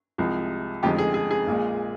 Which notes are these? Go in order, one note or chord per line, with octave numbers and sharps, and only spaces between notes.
C2 C3 F3 G#3
F1 F2 D3 F3 G#3 G4
G#4
G#4
G#4
A#1 A#2 G#3